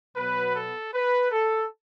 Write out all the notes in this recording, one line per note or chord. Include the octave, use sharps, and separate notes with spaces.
B2 F#3 B3 B4
A4
B4
A4